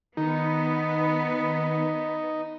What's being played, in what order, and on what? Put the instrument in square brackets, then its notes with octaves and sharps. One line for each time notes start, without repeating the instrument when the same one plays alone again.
[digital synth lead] D#3 [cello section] B3 [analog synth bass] D#4